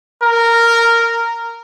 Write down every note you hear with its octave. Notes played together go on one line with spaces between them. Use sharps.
A#4